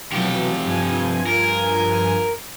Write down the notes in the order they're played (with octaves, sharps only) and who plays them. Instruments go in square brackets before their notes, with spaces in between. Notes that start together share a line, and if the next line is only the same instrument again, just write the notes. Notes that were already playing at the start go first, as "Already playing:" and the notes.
[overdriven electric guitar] F2 G4 [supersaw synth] B2 E3 F#3
[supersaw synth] G2 F3 G#5
[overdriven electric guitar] A#4